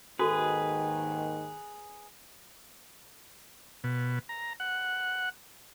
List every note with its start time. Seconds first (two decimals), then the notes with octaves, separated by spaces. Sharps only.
0.19 D#2 G#2 D#3 F#4 G#4 A4 B4
3.84 B2
4.29 A#5
4.60 F#5